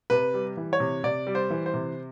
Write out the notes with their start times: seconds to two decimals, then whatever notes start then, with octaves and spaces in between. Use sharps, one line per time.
0.10 C3 B4
0.34 G3
0.57 E3
0.73 C#5
0.80 C3
1.04 C3 D5
1.27 G3
1.35 C5
1.50 E3
1.66 C5
1.74 C3